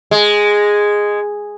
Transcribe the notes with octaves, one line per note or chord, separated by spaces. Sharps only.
G#3